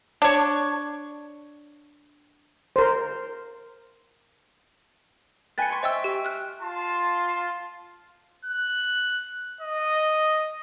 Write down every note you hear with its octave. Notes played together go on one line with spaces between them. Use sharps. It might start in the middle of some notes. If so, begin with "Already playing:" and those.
D4 C#5
A#4 C5
B4 G5 G#5 A6 C#7
C6 C#6
C5 D#5 E5 G5 E6
G4
F6 F#6
F4 A5 C6
F#6
D#5